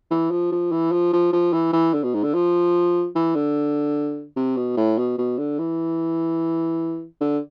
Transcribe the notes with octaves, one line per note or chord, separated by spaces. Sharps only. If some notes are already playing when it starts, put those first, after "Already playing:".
E3
F3
F3
E3
F3
F3
F3
E3
E3
D3
B2
G#2
D3
F3
E3
D3
C3
B2
A2
B2
B2
D3
E3
D3